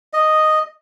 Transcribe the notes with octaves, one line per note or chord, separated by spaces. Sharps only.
D#5